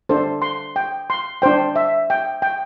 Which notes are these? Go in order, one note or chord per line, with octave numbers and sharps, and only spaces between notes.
D4 A4 C5
C6
G5
C6
D4 C5 G5
E5
G5
G5